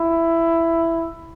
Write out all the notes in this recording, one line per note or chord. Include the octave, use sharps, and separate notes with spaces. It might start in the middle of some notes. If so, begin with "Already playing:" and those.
Already playing: E4